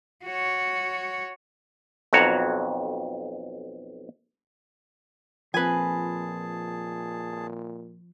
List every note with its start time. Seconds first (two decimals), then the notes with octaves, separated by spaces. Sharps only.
0.25 F#4 C#5
2.13 B1 F2 F#4 C#5 F#5 A#5
5.54 A#2 F3 C4 G#4 B4 G#5 A5